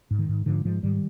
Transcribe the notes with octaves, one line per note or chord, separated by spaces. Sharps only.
G#2
D#3
G#2
G#2 D3 F3
G#2 F3 G#3
G#2 D#3 G3